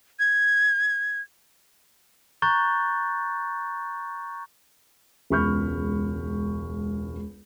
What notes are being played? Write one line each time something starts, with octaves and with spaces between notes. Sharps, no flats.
G#6
A#5 C#6 F#6 G6 A6
E1 C#2 B5 C#6 F6 G6